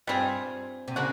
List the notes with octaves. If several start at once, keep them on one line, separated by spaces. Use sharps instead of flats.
G2 G3 C4 F4 G#4
C3
C#3 A#3 D4 F#4